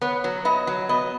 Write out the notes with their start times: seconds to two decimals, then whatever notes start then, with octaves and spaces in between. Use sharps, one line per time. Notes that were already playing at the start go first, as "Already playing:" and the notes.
0.01 B3 C#5
0.24 F#3
0.45 B3 D#5
0.67 F#3
0.89 B3 D#5